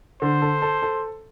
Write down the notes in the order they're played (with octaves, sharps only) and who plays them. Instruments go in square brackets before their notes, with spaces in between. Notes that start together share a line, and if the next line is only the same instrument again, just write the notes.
[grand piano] D3 [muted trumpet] C5
[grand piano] A4
A4
A4